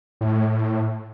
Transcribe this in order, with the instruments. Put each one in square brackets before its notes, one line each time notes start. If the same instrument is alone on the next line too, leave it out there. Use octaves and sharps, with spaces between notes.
[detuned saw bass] A2